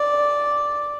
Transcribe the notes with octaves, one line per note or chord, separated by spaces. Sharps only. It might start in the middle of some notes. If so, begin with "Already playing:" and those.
Already playing: D5